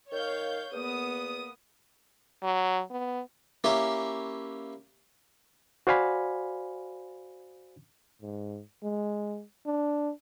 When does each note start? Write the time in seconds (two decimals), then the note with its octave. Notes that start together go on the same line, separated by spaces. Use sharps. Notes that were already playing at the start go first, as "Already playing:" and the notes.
0.12 D#3 C#5 F5 G6
0.72 E2 A#3 B3 D#6
2.43 F#3
2.91 B3
3.64 A#3 C#4 E4 G4 E5
5.87 F#4 C5 D5 F5 G#5 B5
8.22 G#2
8.83 G#3
9.66 D4